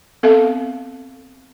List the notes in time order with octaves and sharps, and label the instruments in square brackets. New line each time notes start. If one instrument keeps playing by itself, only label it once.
[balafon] B3 C4 A4 E5 F5